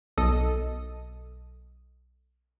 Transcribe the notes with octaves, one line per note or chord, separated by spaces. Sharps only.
B1 A4 D#5 D#6